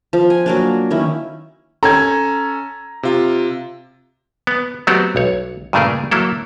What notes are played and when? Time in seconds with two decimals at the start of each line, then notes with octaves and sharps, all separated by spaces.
0.13 F3
0.30 G#5
0.46 F#3 A#3 D4
0.90 D#3 C#4 E4
1.83 C#4 A4 A#5 G#6
3.03 C3 F4
4.47 B3
4.87 F#3 A3 B3 C4 F#4 G4
5.16 B1 C#5
5.73 G2 A#2 C#3 A3 G#4 A#4
6.11 F#3 A#3 E4 A4